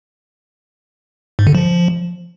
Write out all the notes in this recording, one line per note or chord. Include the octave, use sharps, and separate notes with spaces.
G#2
D3
F3